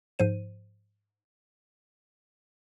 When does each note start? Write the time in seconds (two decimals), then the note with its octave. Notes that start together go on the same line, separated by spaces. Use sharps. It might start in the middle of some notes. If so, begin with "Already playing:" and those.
0.19 G#2 F3 C5 D#7